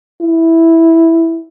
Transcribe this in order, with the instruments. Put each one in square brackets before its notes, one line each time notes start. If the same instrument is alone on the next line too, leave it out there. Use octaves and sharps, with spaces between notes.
[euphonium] E4